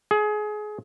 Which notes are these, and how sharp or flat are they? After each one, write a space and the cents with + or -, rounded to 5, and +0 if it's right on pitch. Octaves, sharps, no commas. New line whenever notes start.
G#4 +25